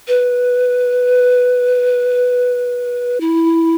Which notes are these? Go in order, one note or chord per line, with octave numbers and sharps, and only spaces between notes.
B4
E4